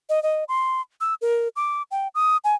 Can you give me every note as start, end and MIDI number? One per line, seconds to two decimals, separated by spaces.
0.09 0.22 75
0.23 0.44 75
0.48 0.81 84
1.01 1.14 88
1.21 1.48 70
1.56 1.82 86
1.91 2.08 79
2.15 2.37 87
2.44 2.55 80